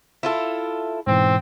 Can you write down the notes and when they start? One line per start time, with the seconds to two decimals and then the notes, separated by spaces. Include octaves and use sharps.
0.23 E4 F4 A4
1.07 G#2 B2 E3 C4